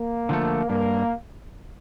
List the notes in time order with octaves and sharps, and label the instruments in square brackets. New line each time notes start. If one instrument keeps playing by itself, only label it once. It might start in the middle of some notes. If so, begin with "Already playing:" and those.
Already playing: [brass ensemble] A#3
[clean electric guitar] D3 F3 A3
[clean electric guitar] G2 [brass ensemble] A#3